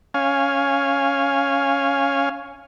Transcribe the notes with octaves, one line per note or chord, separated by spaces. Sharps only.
C#4 F5 G#5